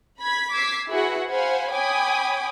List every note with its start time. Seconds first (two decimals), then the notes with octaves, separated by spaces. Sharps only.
0.20 B5 G#6 B6
0.53 D6 E6 G#6 B6 C7
0.90 E4 F#4 G#4 B4 E5 F#5
1.28 C5 F5 F#5 G#5 B5
1.73 C#5 G5 G#5 B5 D6 D#6